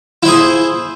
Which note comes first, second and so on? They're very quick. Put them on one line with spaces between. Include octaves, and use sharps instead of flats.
E4 C5 G#4